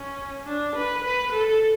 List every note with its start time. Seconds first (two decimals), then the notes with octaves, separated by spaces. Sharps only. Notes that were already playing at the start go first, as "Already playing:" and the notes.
Already playing: C#4
0.47 D4
0.76 B4
1.04 B4
1.33 A4